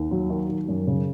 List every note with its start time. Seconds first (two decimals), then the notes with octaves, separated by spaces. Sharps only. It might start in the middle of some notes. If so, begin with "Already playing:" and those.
Already playing: D#2
0.11 F#3
0.30 D#3
0.49 D#3
0.68 F#2
0.87 C#3